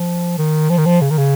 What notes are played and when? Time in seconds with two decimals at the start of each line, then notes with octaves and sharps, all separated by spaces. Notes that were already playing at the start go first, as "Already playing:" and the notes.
Already playing: F3
0.38 D#3
0.70 F3
0.78 D#3
0.85 F3
1.01 C#3
1.10 D#3
1.18 C#3